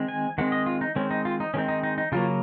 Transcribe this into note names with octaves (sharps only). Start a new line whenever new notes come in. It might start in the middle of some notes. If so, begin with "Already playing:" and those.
Already playing: D#3 G#3 C4
G#5
D#3 G#3 C4 F#5
D#5
F4
D#4
D#3 G#3 C4 C#4
D#4
F4
D#4
D#3 G#3 C4 C#4
D#4
D#4
D#4
C#3 F#3 A#3 F4